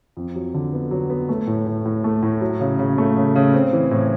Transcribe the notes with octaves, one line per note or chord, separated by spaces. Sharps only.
F2
F#3
D3
B3
F#3
B3
A3
A2
A2
A2
A3
A2
F#3
C#3
C#3
A3
C#3
C#3
C4
E3
A2